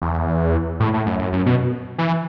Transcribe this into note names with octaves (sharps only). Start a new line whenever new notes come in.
E2
A2
A2
F#2
F#2
F#2
B2
E3